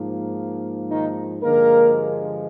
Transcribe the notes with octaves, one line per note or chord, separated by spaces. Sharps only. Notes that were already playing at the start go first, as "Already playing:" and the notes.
Already playing: G#2 F3 A#3
D#3 D#4
G2 D3 F3 G#3 A#3 A#4